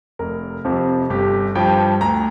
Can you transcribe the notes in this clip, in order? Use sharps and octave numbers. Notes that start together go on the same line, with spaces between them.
F1 A#4
F2 C3 F3
G1 G4
G2 F3 G5
D2 A#5